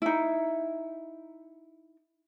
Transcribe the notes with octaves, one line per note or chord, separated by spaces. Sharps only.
D#4 E4